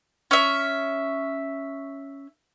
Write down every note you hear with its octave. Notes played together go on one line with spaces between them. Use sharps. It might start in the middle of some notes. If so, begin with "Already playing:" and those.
C#4 E5